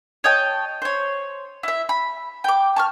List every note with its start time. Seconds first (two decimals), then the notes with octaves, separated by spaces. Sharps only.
0.24 C#5 D#5 G5 A5
0.82 C5 C#5
1.63 E4 E5
1.89 B5
2.44 G5 D6
2.76 A5 C#6 F6